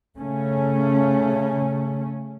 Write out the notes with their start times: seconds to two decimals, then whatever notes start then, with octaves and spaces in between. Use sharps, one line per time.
0.19 C#3 A3 C#4